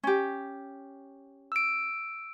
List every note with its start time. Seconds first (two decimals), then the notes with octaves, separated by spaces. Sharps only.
0.03 C#4 G4
1.52 E6 D7